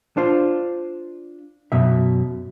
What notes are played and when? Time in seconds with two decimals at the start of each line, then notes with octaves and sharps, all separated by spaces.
0.17 D4 F4 C5
1.72 F#2 B2 E5